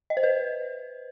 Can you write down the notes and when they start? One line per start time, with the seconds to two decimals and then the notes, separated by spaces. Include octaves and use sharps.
0.10 D#5
0.17 C5
0.23 B4